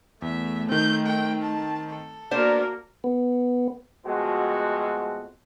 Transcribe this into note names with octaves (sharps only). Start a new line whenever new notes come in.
E2 A3 E5
D#3 C4 G6
G5
A5
A4
A#3 B3 D4 F#4 A#4 C5
B3
F2 B2 G#3 A3 C4 F#4